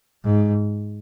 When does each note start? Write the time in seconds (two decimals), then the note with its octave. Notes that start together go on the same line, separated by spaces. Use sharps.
0.25 G#2